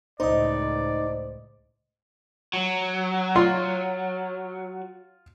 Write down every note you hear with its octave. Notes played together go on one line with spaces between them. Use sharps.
C#2 A2 D#4 C5 D5 D#5
F#3
F4 C6